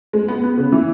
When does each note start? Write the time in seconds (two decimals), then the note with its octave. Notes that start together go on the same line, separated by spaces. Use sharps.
0.13 G#3
0.28 B3
0.44 B3
0.58 C#3
0.72 E3